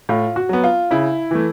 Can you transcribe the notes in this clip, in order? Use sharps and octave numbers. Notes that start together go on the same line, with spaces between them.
A2 F4
F#4
F#3 B3
F4
C#3 E4
E3 A3